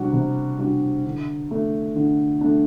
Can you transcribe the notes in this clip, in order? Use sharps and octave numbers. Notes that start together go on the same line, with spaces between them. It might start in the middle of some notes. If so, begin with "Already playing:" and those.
Already playing: C3 G3 D4 F#4
C3
G3 D4 F#4
D3
A3 D4
D3
A3 D4